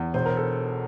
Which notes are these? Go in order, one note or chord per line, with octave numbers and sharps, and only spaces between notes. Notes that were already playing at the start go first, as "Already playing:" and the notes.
Already playing: E2
E1 C5
A#4
A4